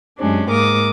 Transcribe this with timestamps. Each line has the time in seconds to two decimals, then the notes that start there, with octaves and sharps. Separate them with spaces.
0.18 F#2 C3 G#3 C#4 D4
0.49 G#2 A#3 A#4 D6 D#6